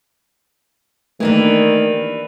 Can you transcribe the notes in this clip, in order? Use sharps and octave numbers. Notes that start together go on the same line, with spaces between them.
D#3 E3 A3 A#3 D4 G4